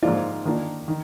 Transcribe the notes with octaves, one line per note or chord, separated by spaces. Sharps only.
G#2 F3 A#3 F4 D5
D#3 A#3 D4 F4
D#3